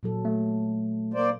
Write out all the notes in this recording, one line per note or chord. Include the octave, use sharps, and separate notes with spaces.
A#2 F#3 A4
A3
A#3 C5 D5